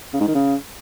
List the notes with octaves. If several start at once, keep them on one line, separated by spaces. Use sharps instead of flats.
C#3
G#2
D#3
C#3